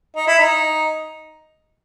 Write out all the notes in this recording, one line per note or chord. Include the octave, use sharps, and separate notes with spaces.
D#4
E4
D#4